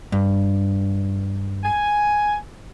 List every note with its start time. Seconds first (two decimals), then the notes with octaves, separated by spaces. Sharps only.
0.12 G2
1.64 G#5